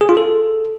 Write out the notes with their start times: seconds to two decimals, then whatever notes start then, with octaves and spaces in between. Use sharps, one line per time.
0.01 G#4
0.09 F4
0.17 A4